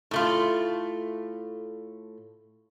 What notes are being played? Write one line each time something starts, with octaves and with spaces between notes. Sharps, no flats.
A2 A3 F4